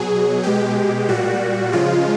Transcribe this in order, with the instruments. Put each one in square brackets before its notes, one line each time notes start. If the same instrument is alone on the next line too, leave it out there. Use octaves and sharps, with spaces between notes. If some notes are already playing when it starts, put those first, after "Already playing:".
Already playing: [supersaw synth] B2 F#3 G#4
B2 G#3 G4
A#2 G3 F#4
C#3 F3 G#3 F4